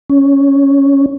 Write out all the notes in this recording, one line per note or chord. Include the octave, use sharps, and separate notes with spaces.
C#4